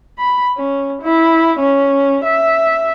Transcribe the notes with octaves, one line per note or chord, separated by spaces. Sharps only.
B5
C#4
E4
C#4
E5